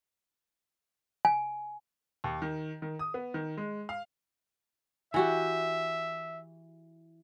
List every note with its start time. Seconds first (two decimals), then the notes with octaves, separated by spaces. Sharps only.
1.25 G#5
2.24 D#2
2.42 D#3
2.82 D#3
2.99 D#6
3.14 B3
3.34 D#3
3.57 G#3
3.89 F5
5.14 E3 F#4 G4 E5